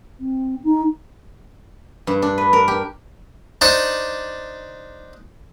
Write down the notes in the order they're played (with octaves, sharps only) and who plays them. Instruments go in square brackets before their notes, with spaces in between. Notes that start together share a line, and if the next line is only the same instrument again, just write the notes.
[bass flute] C4
D#4
[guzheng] G2
D4
B4
A#4
G4
[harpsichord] D4 D#4 C5 D5 C#6